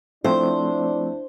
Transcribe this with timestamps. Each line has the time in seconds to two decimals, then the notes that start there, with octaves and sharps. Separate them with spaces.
0.24 F3 A3 C4 D4 E4 C5